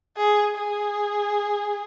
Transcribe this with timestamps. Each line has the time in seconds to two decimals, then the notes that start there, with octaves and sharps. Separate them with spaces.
0.17 G#4
0.56 G#4